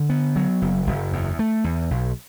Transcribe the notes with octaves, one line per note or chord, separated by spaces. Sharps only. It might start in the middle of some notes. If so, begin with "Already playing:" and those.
Already playing: D3
B3
F#3
F#1
F#1
E2
A3
E2
B1